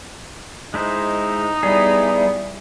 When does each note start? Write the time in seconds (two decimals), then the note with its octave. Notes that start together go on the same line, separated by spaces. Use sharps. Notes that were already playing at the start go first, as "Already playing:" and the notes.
0.74 G#3 D#4 E4 C5
1.63 G3 B3 E4 G#4 D5